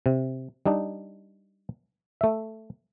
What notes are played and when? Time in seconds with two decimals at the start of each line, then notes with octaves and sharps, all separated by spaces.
0.06 C3
0.66 G3 D4 D#4
2.21 A3 E5